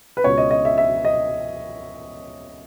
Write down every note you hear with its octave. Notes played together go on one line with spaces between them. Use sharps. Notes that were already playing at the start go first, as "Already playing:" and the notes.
B4
C#2 B2 C#5
D#5
D#5
E5
E5
D#5